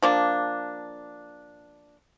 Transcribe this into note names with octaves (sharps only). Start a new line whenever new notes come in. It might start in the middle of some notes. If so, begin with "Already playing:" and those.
F3 A#3 D4